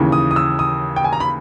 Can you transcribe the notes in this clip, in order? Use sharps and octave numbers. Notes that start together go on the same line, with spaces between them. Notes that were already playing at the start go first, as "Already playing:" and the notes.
Already playing: D#2 C#3 E3
D#6
D#6
E6
D#6
G5
G#5
A#5
B5